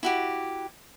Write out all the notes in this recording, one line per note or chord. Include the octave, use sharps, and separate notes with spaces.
E4 F#4 G4